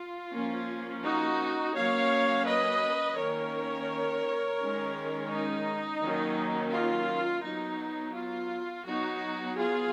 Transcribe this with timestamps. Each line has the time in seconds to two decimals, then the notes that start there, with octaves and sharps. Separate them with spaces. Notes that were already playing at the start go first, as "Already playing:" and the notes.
Already playing: F4
0.33 F3 A#3 C#4
1.04 D#4 F#4
1.75 F#3 A#3 C#4 C#5 F5
2.46 B4 D#5
3.17 D#3 A#3 C#4 A#4 C#5
4.59 D#3 G#3 C#4
5.31 D#4
6.02 D#3 F#3 A#3 C#4
6.73 F4
7.44 F#3 B3 D#4
8.15 F4
8.86 F#3 B3 D#4 F#4
9.57 F4 G#4